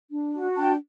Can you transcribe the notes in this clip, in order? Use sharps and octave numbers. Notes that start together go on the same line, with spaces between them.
D4
F#4
D4 G5 A5